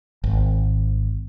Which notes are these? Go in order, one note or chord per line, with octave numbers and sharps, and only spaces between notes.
G#1